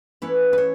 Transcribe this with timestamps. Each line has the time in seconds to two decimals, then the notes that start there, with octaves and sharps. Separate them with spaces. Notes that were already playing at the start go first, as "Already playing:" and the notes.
0.22 E3 A3 C#4 E4 B4
0.53 B4
0.58 C#5